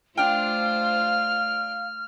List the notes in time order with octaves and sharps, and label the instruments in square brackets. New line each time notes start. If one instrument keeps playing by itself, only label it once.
[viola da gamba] A3 F4 C5 [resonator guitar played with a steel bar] D4 G5 [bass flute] F5 [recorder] F6